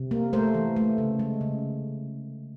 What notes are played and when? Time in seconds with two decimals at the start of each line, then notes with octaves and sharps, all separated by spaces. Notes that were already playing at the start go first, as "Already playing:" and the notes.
Already playing: C3
0.11 A#3
0.33 A3 A#4 C5
0.54 E3
0.76 A3
0.98 C#3
1.19 G#3
1.41 C#3